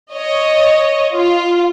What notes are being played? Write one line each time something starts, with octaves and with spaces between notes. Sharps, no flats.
C#5 D#5
F4